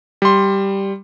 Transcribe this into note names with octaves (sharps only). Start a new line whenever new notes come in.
G3 C6